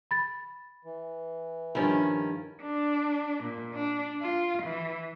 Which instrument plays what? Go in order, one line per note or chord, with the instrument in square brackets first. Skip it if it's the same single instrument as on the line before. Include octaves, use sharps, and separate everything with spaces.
[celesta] B5 A6
[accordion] E3
[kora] G2 F3 E4 [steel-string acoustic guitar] D#3 C#4
[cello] D4
A#2
D4
F4
E3